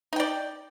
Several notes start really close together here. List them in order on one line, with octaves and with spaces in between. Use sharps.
D#4 G5 D5